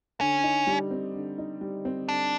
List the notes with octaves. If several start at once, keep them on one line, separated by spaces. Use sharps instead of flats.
D3 C#4
D#4
G3
C4
D3
D#4
G3
C4
D3 D4